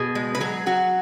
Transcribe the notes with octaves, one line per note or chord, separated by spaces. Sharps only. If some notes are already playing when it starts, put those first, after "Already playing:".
Already playing: B2 G#4
G#3
B4
F#3 G#4
F#3 F#4